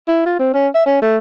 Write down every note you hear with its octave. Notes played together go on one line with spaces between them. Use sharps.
E4
F4
C4
C#4
E5
C#4
A3